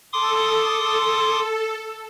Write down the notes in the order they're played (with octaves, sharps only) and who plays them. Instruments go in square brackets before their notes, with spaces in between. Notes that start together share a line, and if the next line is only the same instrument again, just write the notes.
[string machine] A4 [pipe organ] C6 D6 D#6